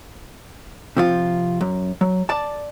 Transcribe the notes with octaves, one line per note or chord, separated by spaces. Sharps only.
C3 F3 F4
F#2
F#3
D5 A5